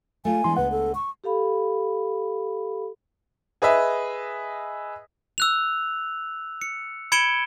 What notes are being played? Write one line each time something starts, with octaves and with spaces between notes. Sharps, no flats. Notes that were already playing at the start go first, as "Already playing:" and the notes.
A3 F4 G#4 G#5
E3 G#3 B3 D4 E4 C6
C#2 B4 F#5
A4
C#6
G4 A4 F5 B5
G#4 B4 D#5 E5
E6 F#6 F7
C#7
B5 G#6 C#7 D7 E7 G7